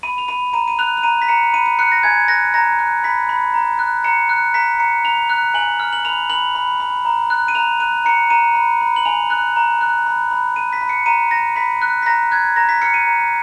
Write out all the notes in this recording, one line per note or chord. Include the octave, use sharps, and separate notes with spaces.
B5 D#7
F7
B5 D#7
A#5 D#7
D#7
F#6 F7
F7
A#5 D#7
B6
A#5 C#7
B5 D#7
D#7
F#6 C#7
A#6
G#5 G#6
F#6 A#6
A#5 A#6
F#6
B5 B6
B5
A#5
F#6
A#5 C#7
F#6
A#5 B6
A#5 C#7
A#5 F7
F#6
G#5 F#7
F6
F#7
B5 F7
B5 F#7
B5
B5
A#5
F#6
D#7
A#5 F7
F#6 D#7
A#5 C#7
A#5 D#7
B5
B5
F#7
G#5 F7
F#6
A#5
F#6
B5
B5
B5 D#7
B6
B5
C#7
A#5 D#7
A#5 A#6
B5 B6
F#6
B6
A#5 A#6
F#6 G#6
A#5 A#6
B6
F6 C#7
D#7
A#5